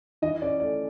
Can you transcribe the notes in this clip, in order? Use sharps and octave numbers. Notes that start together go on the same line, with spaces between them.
E3 D#5
C#4 D5
A3 D5